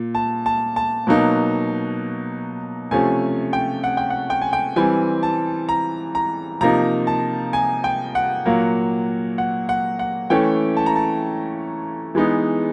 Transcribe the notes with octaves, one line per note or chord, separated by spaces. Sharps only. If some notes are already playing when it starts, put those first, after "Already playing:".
Already playing: A#2
A5
A5
A5
B2 F#3 A#3 D#4
C3 F3 A3 C#4 G#5
G5
F#5
G5
F#5
G5
G#5
G5
E3 G3 C4 G#5
A5
A#5
A#5
C3 F3 A#3 D#4 A#5
A5
G#5
G5
F#5
A#2 F#3 A#3
F#5
F#5
F#5
E3 A3 C#4 G5
A5
A#5
A5
E3 G#3 B3 D#4